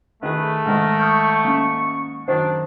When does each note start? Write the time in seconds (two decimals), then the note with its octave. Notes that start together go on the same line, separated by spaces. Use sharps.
0.23 D#3 A3 G#4 B4
0.66 G#2 D#3 A#4
1.00 C#6 D#6 F6 G6
1.45 A#3 C#4
2.28 F#2 D#3 D4 C5